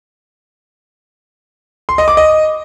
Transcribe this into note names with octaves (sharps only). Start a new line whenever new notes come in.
C6
D#5
D6
D#5